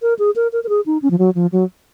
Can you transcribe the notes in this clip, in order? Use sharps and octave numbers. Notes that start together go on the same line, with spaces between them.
A#4
G#4
A#4
A#4
A#4
G#4
D#4
C#4
F3
F#3
F3
F#3